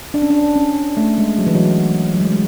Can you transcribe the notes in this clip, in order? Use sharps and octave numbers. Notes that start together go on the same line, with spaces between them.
D4
C#4
D4
C#4
A3
G#3
F#3
E3
F#3
F#3
G#3
G#3